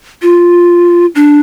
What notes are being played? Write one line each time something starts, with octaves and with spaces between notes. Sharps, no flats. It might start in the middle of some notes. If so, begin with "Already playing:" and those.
F4
D4